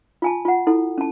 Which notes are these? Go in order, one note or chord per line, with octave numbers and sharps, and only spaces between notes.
F4 G#5 A5
F4 F#5
E4 A4
C#4 A5